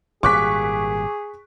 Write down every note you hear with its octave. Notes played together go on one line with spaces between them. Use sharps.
G#1 A#2 G3 G#4 C#6 D6 F#6 B6